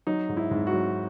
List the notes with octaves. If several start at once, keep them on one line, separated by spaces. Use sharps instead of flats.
F#3 D#4
G#2
E4
G#2
F#4
F#3